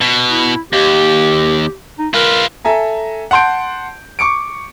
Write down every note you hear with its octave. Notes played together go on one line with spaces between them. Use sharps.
B2
E4
D#2 G4
D#4
F4 A#4 B4
A4 E5 G#5 A#5
F#5 A5 C6 G6 D7
C#6 D6 C#7 D7